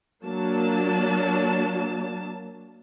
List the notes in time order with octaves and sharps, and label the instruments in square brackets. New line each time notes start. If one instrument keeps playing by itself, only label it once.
[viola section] F#3 A#3 D4 A5